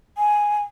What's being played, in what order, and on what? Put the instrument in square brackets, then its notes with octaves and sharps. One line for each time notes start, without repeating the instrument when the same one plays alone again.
[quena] G#5